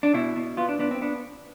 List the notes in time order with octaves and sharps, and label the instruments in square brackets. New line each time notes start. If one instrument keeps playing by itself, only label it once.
[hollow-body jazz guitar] D4
B2 E4
B2
B3 F4
D4
B3 D4
C4
B3 D4